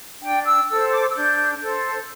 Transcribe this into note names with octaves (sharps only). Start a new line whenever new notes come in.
D4 G5
E6
A4 C5 E6
D6
E6
D4 G6
A4 C5